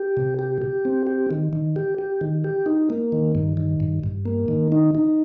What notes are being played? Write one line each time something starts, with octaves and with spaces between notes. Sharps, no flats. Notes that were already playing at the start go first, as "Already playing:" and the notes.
Already playing: G4
C3
G4
G4
C4
G4
D#3
D#3
G4
G4
D#3
G4
D#4
A#3
D#3
G2
D#3
G2
G2
A#3
D#3
D#4
D#4